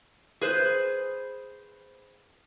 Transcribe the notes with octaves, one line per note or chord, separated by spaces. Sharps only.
G#4 B4 C5